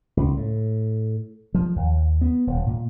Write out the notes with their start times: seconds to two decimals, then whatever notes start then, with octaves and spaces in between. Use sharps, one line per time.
0.17 C#2
0.37 A2
1.54 F3
1.76 D#2
2.21 B3
2.47 D#1
2.66 A#2